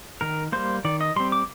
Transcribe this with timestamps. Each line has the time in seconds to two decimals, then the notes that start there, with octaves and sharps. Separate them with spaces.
0.21 D#3 A#4
0.52 G3 A#3 C5
0.85 D#3 D5
1.01 D#5
1.16 G3 C4 C6
1.32 D6